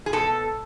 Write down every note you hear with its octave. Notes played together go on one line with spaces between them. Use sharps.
G#4
B2 A4